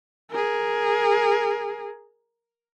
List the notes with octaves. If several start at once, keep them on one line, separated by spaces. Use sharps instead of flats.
G#4 A#4